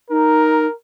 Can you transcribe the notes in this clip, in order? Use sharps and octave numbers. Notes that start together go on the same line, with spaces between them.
D#4 A#4